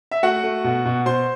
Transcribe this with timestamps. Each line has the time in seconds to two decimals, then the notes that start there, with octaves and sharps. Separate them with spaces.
0.11 E5
0.23 A3 F#4 F#5
0.43 A3
0.64 B2
0.85 B2
1.06 B2 C5 C6